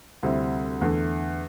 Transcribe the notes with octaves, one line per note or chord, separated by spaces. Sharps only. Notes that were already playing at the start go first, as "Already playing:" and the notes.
D2 C3 G3 C4 E4
E2 D3 A3